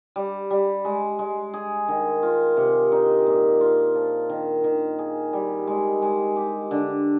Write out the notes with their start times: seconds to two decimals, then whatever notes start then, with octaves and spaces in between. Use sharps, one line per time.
0.16 G3
0.50 G3
0.85 G#3
1.19 G#3
1.54 G#4
1.88 D#3
2.23 F4
2.57 C3
2.92 D#4
3.26 A#2
3.61 F4
3.95 F3
4.30 D#3
4.64 D#3
4.99 G#4
5.33 G3
5.67 G#3
6.02 G#3
6.36 G4
6.71 D3